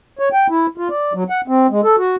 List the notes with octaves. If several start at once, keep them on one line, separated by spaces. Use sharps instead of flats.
C#5
G5
E4
F4
D5
F#3
F#5
C4
G#3
A4
F#4